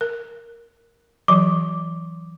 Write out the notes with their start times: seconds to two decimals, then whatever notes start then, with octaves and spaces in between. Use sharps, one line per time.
0.01 A#4
1.28 E3 F#3 D6